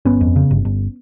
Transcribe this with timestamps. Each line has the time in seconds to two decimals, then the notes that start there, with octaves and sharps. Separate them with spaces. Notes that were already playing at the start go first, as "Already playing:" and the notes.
0.05 G1 B3 C#4
0.21 F2
0.36 C#3
0.51 G1
0.65 G1